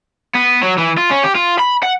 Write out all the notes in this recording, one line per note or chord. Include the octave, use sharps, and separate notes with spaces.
B3
F#3
E3
F4
C#4
G4
F4
B5
F#5